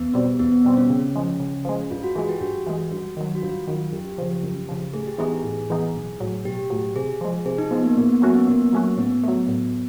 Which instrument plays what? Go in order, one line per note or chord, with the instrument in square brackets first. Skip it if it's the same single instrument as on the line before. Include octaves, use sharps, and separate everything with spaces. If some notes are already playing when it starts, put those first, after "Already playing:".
Already playing: [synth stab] E2 [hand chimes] B3
[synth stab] B2 G3 C4
[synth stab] E2 [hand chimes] B3
[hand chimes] B3
[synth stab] B2 G3 C4
[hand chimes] C#4
[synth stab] C#3
F3 G#3
C#3
F3 G#3
[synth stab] G2 [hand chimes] F4
[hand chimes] F#4
[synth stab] E3 G#3 [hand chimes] G#4
[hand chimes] G4
[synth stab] G2 [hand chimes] F#4
[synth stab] E3 G#3
[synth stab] G2 [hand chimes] F#4
[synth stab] D#3 F#3
[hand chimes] F#4
[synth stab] G2 [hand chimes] F4
[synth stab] D#3 F#3
[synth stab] F#2 [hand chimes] G4
[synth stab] C#3 F3
F#2
C#3 F3
[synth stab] A2 [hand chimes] G#4
[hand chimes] G4
[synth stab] E3 G#3 B3 D#4 [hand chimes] G#4
[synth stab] A2
E3 G#3 B3 D#4
B1
A2 F#3
[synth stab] B1 [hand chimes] G4
[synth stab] A2 F#3
[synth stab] C3 [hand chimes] G#4
[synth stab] F3 G#3
[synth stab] C3 [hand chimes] G#4
[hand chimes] D#4
[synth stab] F3 G#3 [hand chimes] B3
[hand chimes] A#3
[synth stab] A#2 [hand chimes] B3
[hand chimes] A#3
[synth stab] F#3 A3 C#4 F#4 [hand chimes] B3
[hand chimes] B3
[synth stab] A#2 [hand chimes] A#3
[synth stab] F#3 A3 C#4 F#4
[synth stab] A2 [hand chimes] B3
[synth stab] F#3 A3
A2